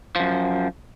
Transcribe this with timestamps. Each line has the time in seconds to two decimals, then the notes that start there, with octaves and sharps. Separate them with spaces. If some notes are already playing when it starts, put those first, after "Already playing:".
0.16 F#2 F3